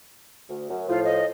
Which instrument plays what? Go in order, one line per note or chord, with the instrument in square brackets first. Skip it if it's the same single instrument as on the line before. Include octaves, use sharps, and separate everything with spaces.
[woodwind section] D2
F#2
[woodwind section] A2 F3 [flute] F4
[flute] D#5